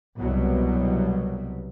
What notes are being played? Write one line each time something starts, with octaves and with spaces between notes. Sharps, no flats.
C2 B2 F#3